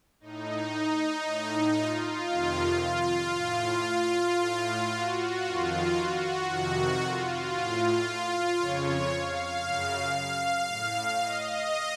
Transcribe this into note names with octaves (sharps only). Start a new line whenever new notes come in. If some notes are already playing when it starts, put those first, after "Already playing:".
A2 D#4
A2
F4
F2 C3 D#3
F4
A2
A2
F#4
F2 D#3 F4
F#4
F2 C3 D#3 F#4
F4
A2
F2 C#3 C#5
F5
F#2 C#3
F5
A2
D#5